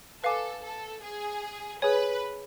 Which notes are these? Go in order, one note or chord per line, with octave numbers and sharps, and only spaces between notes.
A4 B4 F5 G#5 D6
A4
G#4
G#4 B4 C#5 G#5